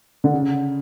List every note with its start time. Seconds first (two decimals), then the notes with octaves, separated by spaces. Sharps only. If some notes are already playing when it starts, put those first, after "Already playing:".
0.24 D3
0.33 C#3